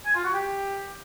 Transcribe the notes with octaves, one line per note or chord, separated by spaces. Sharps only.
G#5
F4
F#4
G4